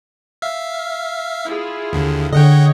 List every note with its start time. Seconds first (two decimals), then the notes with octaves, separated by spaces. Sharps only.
0.42 E5 F5
1.46 E4 F4 G#4
1.93 D#2 D3
2.33 D3 G#4 C#5 D#5 F#5 G5